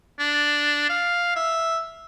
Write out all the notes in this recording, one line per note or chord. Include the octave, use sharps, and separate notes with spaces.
D4
F5
E5